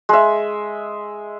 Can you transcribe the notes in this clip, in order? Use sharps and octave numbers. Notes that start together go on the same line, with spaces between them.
G#3 E5